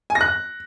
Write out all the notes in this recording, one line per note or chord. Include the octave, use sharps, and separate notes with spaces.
G#5
A#6
F#6